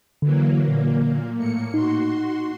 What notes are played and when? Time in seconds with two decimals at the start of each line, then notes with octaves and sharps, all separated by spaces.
0.22 D3 E3 F#3 A#3
0.65 A#2 A#3
1.36 A2 A#3 C#7
1.74 D#4 F#4 C6